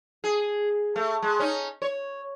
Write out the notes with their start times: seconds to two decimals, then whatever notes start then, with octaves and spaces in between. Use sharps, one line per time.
0.24 G#4
0.96 A3
1.22 G#3
1.40 C#4 D#4
1.82 C#5